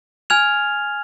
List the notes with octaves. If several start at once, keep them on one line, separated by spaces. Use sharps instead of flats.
G#5 F6 G#6 F7